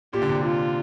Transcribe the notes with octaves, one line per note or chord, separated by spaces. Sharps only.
A#2 G4
D3
C3
F4